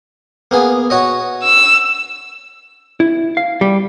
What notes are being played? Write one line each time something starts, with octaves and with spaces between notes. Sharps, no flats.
A#3 B3 G#4
F#4 C#5 D#5
E6
E4
F5
G3